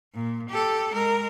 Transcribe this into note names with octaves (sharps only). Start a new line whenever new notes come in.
A#2
G4 A4
G#3 A#4